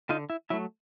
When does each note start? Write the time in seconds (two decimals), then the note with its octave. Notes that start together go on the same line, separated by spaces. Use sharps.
0.09 D3 D#4 F4
0.30 E4
0.50 F#3 A3 E4